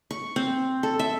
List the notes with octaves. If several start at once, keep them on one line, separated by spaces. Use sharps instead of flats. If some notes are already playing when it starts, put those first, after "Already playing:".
C#6
C4
A4
E5